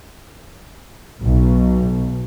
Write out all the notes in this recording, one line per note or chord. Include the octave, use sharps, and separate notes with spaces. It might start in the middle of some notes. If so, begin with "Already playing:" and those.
B1